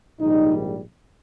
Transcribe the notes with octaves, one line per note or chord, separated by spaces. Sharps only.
A#1 G#2 D#3 G3 D#4